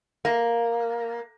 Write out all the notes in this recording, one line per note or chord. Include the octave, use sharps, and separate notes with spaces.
A#3